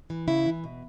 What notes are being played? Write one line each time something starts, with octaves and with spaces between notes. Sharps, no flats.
E3
C#3 E4
E3
B2